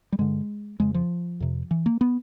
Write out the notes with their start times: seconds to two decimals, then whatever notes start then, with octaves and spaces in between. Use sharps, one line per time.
0.12 G3
0.19 G2 D3 G#3
0.80 F2 C#3 G#3
0.94 F3
1.40 F2 C3
1.71 E3
1.86 A#3
2.01 B3